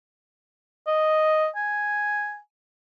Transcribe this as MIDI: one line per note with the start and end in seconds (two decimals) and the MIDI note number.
0.87 1.47 75
1.56 2.38 80